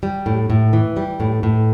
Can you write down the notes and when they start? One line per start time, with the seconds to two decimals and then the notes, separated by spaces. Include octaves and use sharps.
0.03 G3
0.26 A2
0.50 A2
0.73 E3
0.97 G3
1.20 A2
1.43 A2